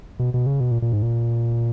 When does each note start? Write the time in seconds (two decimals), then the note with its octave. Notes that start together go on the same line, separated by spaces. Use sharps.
0.19 B2
0.34 B2
0.46 C#3
0.60 B2
0.71 A#2
0.82 A#2
0.92 G#2
1.02 A#2